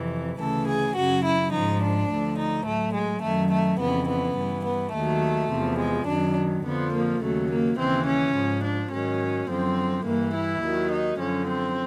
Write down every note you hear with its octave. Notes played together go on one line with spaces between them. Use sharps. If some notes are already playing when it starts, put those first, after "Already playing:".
Already playing: F2 C3 E3
D2 C#3 E3 A4
G#4
F#2 C#3 F#3 F#4
E4
F3 D#4
G#2
D4
D2 D3 F3
D#4
A2 F#3 A3
G#3
F#2 D#3 F#3 A3
A3
F2 C#3 E3 B3
B3
G2 E3
B3
D#2 D#3 F#3 A3
E2 C3 F3
G#3
F#2 D#3 F#3 D4
F2 D3 F3 B3
A#3
D#2 C#3 F#3 A3
A#3
D#2 C#3 E3 C4
C#4
G#2 F3
D4
G#2 D#3 F#3 C#4
F#2 D3 F3 C4
G2 E3 A#3
E4
D#2 D#3 F#3
D#4
F#2 D3 F3 C#4
C4